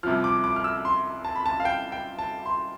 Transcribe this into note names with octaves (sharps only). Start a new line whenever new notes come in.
C2 C3 F3 F6
D6
D6
F6
E6
C6
A5
B5
A5
F5
G5
G5
A5
C6